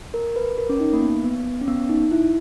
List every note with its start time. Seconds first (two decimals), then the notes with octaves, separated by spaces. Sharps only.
0.14 A#4
0.36 B4
0.58 A#4
0.69 C#4
0.80 D#4
0.93 A#3
1.02 B3
1.24 B3
1.61 C#4
1.68 B3
1.89 D#4
2.11 E4